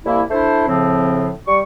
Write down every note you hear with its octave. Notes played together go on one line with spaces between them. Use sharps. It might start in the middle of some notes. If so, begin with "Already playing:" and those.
C2 A#3 E4
A3 D4 E4 C5
A2 C#3 F3 C4
G3 C#6